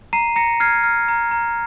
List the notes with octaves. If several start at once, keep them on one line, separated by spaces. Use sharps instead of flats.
A#5 C7 D#7
A#5 A#6 C#7
F6 G#6 C7
F6
A#5
A#5